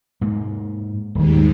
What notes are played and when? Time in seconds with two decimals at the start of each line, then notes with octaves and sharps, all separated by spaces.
0.21 G#2 A#3
1.15 D#1 D#2 G#2 D#3